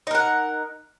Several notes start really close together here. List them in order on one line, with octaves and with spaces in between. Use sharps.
D#4 A#4 F#5